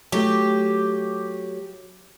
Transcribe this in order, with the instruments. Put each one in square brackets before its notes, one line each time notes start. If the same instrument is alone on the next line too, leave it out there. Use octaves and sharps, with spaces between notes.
[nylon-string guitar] F#3 A3 [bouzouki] G4